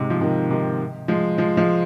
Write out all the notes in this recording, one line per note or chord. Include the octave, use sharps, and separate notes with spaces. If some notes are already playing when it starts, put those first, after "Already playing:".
Already playing: G#2 C3
F3
C3 D#3
C3 D#3
F3 G#3
F3 G#3
F3 G#3